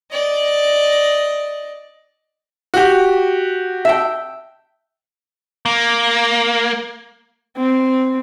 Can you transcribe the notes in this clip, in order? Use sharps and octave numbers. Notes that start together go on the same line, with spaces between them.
D5 D#5
F#4 G4
E5 G5
A#3
C4